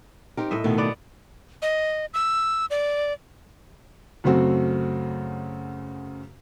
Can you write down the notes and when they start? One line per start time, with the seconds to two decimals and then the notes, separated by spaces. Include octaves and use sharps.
0.37 C4 D#4 G4 A#4
0.51 A2 D#5 E5
0.64 B2 D#3 A3
0.78 B3 D5 F#5
1.62 D#5
2.14 E6
2.70 D5
4.24 F#2 C#3 A3 C4 F#4